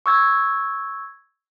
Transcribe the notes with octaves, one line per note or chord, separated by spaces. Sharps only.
C#6 E6 G#6